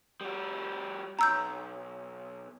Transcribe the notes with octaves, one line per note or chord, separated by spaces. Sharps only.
G3 F#4
B1 A#5 E6 G6